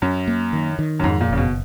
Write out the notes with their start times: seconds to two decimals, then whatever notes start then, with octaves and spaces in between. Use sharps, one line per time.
0.02 F#2 C#4
0.28 A#3
0.53 D#3
0.79 D#3
0.99 F#2
1.04 F2 G#2
1.21 A#2
1.29 F#1 C#3
1.37 B2